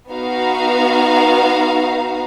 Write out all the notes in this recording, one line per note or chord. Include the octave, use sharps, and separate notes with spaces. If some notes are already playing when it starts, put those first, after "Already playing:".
B3 D#4 F#4 F5 A#5